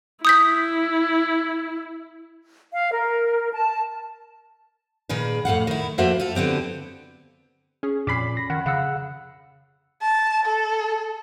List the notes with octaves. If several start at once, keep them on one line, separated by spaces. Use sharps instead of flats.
E4 D#6 G6 B6
F5
A#4
A5
A#2 D#3 G#4 B4
F2 A2 F5 F#5
D#3 E4
F2 A#3 F4 F#4 C5 E5
F4 A4
D3 B3 C4 G4
C#4 G#4
F2 A#2 C#4 B5 D6 B6 C7
A#6
D#3 F#5
C#3 F5 F#5 E6
A5
A4